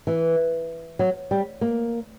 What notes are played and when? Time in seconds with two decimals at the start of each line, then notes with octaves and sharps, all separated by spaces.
0.07 E3
0.99 F#3
1.31 G3
1.61 A#3